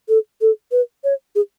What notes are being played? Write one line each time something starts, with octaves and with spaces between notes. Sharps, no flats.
A4
A4
B4
C#5
G#4